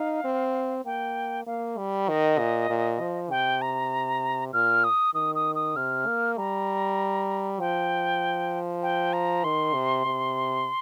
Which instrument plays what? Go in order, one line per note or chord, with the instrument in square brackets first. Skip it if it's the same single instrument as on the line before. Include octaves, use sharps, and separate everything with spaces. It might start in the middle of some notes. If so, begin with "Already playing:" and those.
Already playing: [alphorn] D#4 [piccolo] F5
[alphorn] C4
[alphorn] A#3 [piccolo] G5
[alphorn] A#3 [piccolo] F5
[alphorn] G3
[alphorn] D#3 [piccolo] D#5
[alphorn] A#2
A#2
F3
[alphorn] C3 [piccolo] G5
[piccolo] A#5
[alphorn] A#2 [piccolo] F6
[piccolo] D#6
[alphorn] D#3 [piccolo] D#6
[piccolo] D#6
D#6
[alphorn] C3 [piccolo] F6
[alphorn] A#3
[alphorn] G3 [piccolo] A#5
[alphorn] F3 [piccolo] G5
[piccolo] G5
A#5
[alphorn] D#3 [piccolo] C6
[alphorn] C3
C3